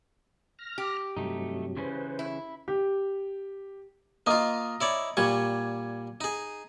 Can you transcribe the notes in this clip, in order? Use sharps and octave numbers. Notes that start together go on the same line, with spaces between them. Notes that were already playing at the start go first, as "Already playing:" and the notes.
F6 A#6
G4
G2 C3 F#3 A3 D#4
C#3 E3 C#4 B4 C5
E4
G4
A#3 F4 D#5 A#5 D#6
E4 C#5 D5
A#2 G3 C#6 G#6
D#4 G#4